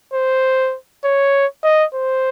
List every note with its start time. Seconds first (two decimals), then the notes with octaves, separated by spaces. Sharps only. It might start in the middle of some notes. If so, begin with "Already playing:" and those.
0.13 C5
1.04 C#5
1.64 D#5
1.94 C5